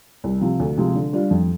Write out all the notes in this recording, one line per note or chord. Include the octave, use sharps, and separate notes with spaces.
C2
C3 F3
D2
C3 F3 G#3
D3
G3 D4 F4
F2